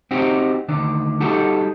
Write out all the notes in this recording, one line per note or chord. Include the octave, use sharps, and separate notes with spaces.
C4 D#4 F#4 G4
D2 D#3 D4
G3 D#4 F#4 G4 A4